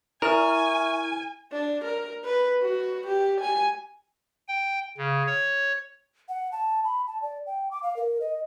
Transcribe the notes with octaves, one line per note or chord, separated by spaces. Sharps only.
E4 A#4 E5 G#5 C#6 F6
D4
A#4
B4
F#4
G4
G#5
G5
C#3
C#5
F#5
A5
B5
A5
D5
G5
D6
F5
A#4
D#5